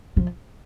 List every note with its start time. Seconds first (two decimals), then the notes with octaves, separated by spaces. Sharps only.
0.17 F3